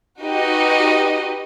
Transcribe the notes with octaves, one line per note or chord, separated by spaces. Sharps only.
D#4 F#4 G4 B4 D#5